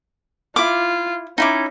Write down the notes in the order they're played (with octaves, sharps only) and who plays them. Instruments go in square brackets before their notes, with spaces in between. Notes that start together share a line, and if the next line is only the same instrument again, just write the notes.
[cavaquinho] E4 D6 [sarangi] F4
[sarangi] C#4 [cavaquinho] D#4 E4 D6